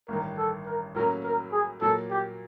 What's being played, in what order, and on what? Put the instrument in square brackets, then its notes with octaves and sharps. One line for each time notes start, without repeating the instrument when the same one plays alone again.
[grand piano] A1 G2 D#3 [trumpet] A#4
[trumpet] A4
A#4
[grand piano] A2 F#3 A#3 C#4 [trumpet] A#4
[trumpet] A#4
G#4
[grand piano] A#2 F#3 A#3 [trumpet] A4
[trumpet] G4